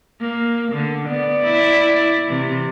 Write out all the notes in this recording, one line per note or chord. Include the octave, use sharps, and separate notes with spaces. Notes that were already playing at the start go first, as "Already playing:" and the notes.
A#3
D3
B3 D5
E4
C3 E3